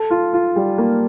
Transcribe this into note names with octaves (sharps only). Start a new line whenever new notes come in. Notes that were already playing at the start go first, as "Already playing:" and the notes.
Already playing: A4
F4
F4
G3
A#3